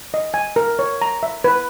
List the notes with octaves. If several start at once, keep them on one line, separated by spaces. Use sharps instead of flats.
D#5
G#5
A#4
C#5
A#5
E5
B4